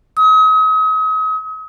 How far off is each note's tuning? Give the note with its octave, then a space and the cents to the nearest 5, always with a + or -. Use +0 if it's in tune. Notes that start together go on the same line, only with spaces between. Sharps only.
D#6 +40